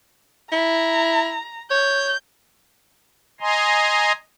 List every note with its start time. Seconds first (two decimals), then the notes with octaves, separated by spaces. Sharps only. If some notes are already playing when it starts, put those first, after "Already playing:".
0.52 E4 A#5
1.71 C#5 G6
3.41 D#5 G#5 A#5 C6